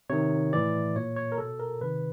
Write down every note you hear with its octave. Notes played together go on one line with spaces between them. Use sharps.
C3 D#3 C#5
A2 E3 D5
A#2 C#5
C#5
A#4
B2 A4
A#4
C3 D#3 B4